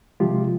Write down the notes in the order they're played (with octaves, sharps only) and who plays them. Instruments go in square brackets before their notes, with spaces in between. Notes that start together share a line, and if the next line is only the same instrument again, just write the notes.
[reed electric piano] C3 F3 G#3 F4 G4